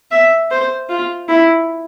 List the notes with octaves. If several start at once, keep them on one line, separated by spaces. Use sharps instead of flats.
E5
C5
F4
E4